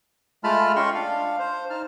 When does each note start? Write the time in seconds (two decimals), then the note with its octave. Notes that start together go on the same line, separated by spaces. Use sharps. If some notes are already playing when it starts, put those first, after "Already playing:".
0.44 G#3 A3 F4 A5 B5 F6
0.76 C#4 F4 D#5 G5 C6 C#6
0.95 D4 F5
1.39 C5
1.70 D#4 A5 F6